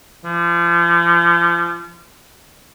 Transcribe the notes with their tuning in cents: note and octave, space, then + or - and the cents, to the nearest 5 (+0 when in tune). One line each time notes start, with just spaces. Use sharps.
F3 -35